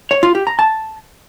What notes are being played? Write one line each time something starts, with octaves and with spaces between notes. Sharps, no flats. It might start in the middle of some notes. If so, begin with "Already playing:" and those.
C#5
F4
G4
A#5
A5